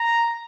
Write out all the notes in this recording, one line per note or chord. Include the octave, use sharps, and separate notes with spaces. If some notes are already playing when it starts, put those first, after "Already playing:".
Already playing: A#5